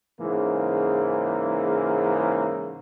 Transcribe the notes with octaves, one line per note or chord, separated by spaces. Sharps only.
G#2 C#3 E3 A#3